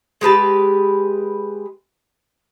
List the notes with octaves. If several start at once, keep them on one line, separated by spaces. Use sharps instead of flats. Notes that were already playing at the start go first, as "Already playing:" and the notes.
G#3 G4 B4 A5